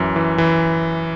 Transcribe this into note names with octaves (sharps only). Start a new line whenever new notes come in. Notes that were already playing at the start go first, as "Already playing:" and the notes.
Already playing: F#2 E3
E3
E3